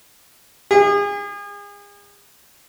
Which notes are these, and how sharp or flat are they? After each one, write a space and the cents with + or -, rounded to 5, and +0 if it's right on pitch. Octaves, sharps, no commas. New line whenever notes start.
G#4 -35